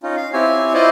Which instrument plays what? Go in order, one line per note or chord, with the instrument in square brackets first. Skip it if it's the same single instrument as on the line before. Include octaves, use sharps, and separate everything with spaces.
[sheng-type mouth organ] C#4 D#4 F4
F5
C4 E4 G4 C#5 G#5
E4 F4 C5 D5 D#5 F5